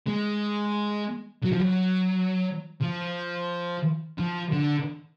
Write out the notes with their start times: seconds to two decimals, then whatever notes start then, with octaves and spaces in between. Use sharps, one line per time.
0.07 G#3
1.43 F#3
1.52 F3
1.59 F#3
2.81 F3
4.18 F3
4.52 D3